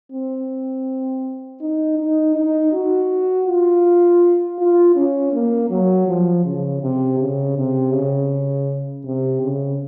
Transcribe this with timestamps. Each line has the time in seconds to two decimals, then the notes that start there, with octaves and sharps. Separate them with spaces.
0.12 C4
1.61 D#4
1.98 D#4
2.35 D#4
2.73 F#4
3.47 F4
4.59 F4
4.96 C#4
5.33 A#3
5.70 F#3
6.07 F3
6.45 C#3
6.82 C3
7.19 C#3
7.57 C3
7.93 C#3
9.05 C3
9.43 C#3